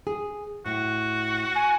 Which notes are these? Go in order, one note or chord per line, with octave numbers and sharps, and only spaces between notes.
G#4
A2 F#4
G#5